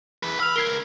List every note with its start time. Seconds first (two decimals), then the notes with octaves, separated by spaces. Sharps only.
0.23 E2 B4
0.40 B5 E6 F6 F7
0.56 C#2 A#4 G#6 C7 G7